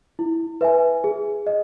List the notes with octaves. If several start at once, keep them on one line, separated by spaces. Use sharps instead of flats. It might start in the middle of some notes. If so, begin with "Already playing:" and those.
E4
B4 E5 G#5
G#4
D#5